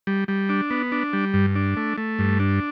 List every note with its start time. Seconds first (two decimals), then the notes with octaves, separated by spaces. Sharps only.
0.07 G3
0.28 G3
0.49 D4
0.70 B3
0.92 D4
1.13 G3
1.34 G2
1.55 D4
1.77 A3
1.98 A3
2.19 G2
2.40 D4